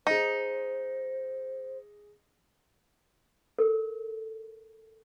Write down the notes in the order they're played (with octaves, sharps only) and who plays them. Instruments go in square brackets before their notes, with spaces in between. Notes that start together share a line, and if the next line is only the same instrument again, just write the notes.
[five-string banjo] D#4 [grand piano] G#4 A#6 [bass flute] C5
[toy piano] A4 A#4